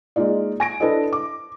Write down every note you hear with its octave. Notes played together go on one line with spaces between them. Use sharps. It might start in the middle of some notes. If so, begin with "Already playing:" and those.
G#3 A#3 D#4 F4 D5
G#5 A#6 D7
D4 E4 A4 B4 C5 D#5
D6